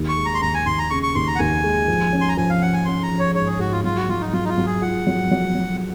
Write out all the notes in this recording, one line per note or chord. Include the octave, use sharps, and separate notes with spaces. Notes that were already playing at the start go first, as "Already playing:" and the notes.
Already playing: D#2
C#6
G#3
A#5
C6
D#2 A#5
G#5
D#2 C6
A#5
C#3 C#6
C#6
D#2 C6
A#5
F#5
D#2 G#5
G#3
F3
C#4
C6
A#5
F3 G#5
F5
C#4 F#5
G#5
C#4 C6
A#5
F3
C#5
G#2 C#5
G#4
G#2 F#4
F4
F#3 F4
F#4
F#3 F4
D#4
F#3 F4
D#4
F4
F#3
G#4
F4 F#5
F#3
F#3
F#3